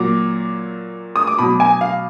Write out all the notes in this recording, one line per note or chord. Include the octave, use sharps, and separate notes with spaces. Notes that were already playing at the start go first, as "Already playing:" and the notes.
Already playing: A#2 F#3 D6
D#6
D6
B2 F#3 B5
G#5
F5